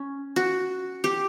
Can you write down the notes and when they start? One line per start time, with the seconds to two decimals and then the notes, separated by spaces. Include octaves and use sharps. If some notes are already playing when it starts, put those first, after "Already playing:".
Already playing: C#4
0.36 F#4
1.04 G4